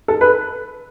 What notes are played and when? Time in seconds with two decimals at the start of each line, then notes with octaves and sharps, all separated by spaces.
0.08 A4
0.21 B4